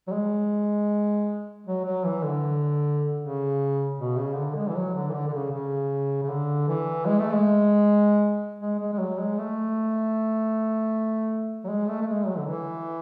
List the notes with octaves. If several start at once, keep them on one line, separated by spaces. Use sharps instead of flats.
F#3
G#3
F#3
F#3
E3
D3
C#3
B2
C#3
D3
G#3
E3
F#3
D3
E3
D3
D3
C#3
C#3
C#3
D3
E3
G#3
A3
G#3
G#3
G#3
G#3
F#3
G#3
A3
F#3
G#3
A3
A3
G#3
F#3
D3
E3